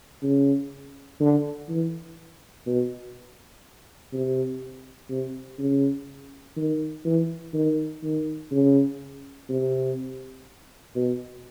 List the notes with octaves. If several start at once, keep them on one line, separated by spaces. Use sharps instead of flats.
C#3
D3
E3
B2
C3
C3
C#3
D#3
E3
D#3
D#3
C#3
C3
B2